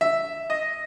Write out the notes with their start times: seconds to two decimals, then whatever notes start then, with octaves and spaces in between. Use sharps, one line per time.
0.01 E5
0.50 D#5